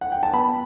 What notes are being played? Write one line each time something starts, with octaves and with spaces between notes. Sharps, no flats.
F#5
G5
A5
B3 B5